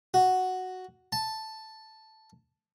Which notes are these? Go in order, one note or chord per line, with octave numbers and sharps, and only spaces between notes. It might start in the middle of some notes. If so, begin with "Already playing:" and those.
F#4
A5